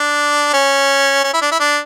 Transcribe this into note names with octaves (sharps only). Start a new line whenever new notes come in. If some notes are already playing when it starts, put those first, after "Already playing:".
Already playing: D4
C#4
C#4
E4
D4
E4
D4